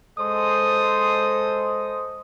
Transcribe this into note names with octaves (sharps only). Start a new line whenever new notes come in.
G#3 A4 C5 D#5 C6 D#6